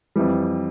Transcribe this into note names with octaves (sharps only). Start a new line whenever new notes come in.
F2 E3 G3